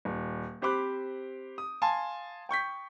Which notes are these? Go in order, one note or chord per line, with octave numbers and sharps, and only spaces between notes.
D#1
C4 G4 C5 B5 D6 F#6
D#6
F5 G#5 A5 C6
G5 C#6 G6 B6